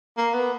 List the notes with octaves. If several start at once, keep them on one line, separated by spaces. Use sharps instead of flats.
A#3
B3